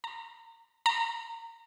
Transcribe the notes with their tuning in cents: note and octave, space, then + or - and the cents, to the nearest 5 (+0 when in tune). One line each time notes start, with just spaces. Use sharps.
A#5 -30
A#5 -25